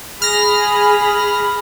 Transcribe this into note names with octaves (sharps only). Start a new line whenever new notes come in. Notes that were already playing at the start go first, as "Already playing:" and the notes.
G#4 B5 F6 A#6